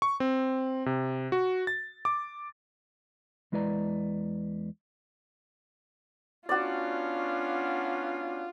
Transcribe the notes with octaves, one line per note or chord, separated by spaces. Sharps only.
C#6
C4
C3
F#4
A6
D6
E2 G#3 E4 B4 D5 A#5
B3 C#4 D4 F4 F#4 D5